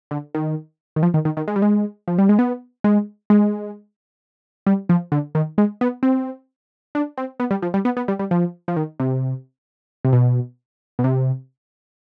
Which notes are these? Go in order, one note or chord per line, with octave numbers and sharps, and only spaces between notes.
D3
D#3
D#3
F3
D#3
D#3
D#3
G#3
G3
G#3
F3
G3
G#3
B3
G#3
G#3
G3
F3
D3
D#3
G#3
B3
C4
D4
C4
B3
G3
F3
G3
B3
B3
G3
G3
F3
F3
D#3
C3
C3
B2
B2
C3